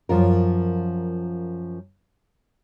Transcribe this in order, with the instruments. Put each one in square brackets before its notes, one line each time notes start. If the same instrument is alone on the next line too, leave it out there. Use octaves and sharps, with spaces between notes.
[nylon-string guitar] F#2 F3 F4 A#4